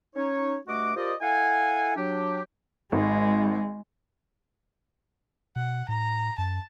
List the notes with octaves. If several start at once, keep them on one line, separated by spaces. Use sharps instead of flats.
C#4 D#4 C#5
G2 A3 F#4 D#5 F#5 D6
F4 G4 A#4 C5 D5 D#5
E4 A4 F5 F#5 G#5
F#3 D4 G4
G#1 G#3
B2 F#5
A2 A#5
F#2 A5